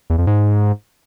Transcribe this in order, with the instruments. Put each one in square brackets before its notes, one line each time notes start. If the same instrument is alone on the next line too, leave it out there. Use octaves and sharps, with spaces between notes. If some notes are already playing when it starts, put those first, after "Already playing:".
[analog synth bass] E2
F2
G#2